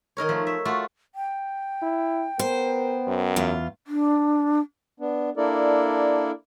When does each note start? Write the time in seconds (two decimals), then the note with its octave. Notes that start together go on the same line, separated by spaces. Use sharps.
0.17 D#3 D#4 A#4 C#5
0.29 F3 A3
0.47 E5
0.65 A3 F4 F#4
1.15 G5
1.83 E4
2.39 B3 A#4 C5
3.08 F#2
3.36 E2 F4
3.87 D4
5.00 B3 D4
5.37 A#3 D4 E4 A4 A#4 D5